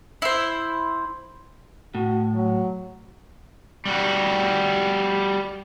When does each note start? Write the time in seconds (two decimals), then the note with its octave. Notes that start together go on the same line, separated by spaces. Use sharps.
0.22 E4 C5
1.95 A2 F#4
2.35 F#3
3.86 G3 F#4